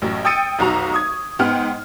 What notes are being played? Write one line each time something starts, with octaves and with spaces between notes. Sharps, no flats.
A1 F#2 A2
G5 D#6 E6 A6 C#7 D#7
F1 B1 F#4 A#5
C#6 D#6 G#6
G#2 B3 F#5 G5 F6